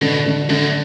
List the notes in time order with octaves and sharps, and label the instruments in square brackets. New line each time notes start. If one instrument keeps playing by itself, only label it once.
[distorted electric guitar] B2 [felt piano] D3
[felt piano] D3
[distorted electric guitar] F#2 [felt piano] D3